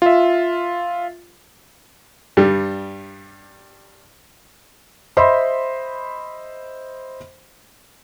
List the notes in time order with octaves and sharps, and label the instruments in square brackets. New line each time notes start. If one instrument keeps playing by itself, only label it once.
[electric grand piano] F4 E5
[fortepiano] G2 G3
[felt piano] C5 D#5 E5 B5 C6